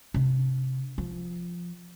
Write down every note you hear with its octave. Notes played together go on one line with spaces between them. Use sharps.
C3 D4
F3